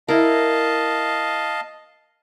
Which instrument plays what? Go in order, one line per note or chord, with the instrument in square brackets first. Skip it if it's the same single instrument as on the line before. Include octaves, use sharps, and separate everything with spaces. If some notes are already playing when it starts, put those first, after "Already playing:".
[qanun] E4 A#4 [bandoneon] D#5 F5 A5